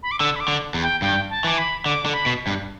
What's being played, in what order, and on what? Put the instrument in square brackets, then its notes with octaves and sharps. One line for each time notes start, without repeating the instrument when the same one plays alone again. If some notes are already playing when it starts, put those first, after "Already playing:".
[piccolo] B5
D6
[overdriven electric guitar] D3 [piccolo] E6
[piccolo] B5
D6
[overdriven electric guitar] D3
E2
[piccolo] G5
[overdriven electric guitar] G2 [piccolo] G5
[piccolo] A5
[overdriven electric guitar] E3 [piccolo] D6
[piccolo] B5
[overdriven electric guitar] D3 [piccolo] D6
[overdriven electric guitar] D3
[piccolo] B5
[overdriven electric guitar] B2
G2